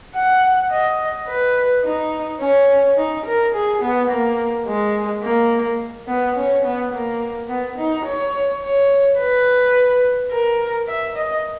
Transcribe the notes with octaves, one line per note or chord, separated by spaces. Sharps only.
F#5
D#5
B4
D#4
C#4
D#4
A#4
G#4
B3
A#3
G#3
A#3
B3
C#4
B3
A#3
B3
D#4
C#5
C#5
B4
A#4
E5
D#5